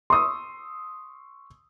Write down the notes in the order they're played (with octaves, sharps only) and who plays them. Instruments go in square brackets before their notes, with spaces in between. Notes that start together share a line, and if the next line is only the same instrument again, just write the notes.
[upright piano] C6 C#6 D#6 E6